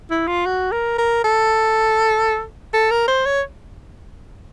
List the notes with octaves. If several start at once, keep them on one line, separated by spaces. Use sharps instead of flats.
E4
F4
F#4
A#4
A#4
A4
A4
A#4
C5
C#5